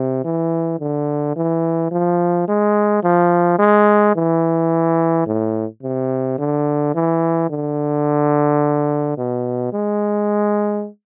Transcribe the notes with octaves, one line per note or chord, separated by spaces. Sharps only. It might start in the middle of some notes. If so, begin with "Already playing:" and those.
Already playing: C3
E3
D3
E3
F3
G#3
F3
G#3
E3
A2
C3
D3
E3
D3
B2
G#3